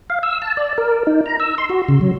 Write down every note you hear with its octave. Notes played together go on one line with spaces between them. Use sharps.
F5
E6
A5
D5
A#4
D#4
A#5
E6
C6
F#4
C#3
F#3